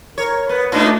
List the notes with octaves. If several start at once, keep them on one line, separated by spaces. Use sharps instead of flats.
A#4 C#5
B3 B4
A#2 A3 D4 D#4